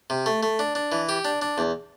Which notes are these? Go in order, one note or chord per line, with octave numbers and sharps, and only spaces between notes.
C3
A3
A3
D4
D4
E3
G4
D4
D4
E2